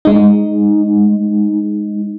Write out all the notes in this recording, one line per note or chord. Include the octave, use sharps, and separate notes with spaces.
G#3 D#4